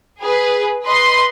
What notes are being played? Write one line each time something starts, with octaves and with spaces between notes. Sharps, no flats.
G#4 B4
B4 D#5 C6